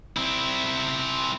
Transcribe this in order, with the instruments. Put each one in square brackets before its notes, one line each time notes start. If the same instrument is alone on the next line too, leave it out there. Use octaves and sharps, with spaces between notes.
[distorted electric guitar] C4 E4